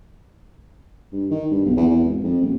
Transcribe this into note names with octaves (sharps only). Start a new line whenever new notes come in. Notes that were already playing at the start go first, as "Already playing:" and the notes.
G2
D#3
G2
B1
E2
E2
G#1
F2
D#1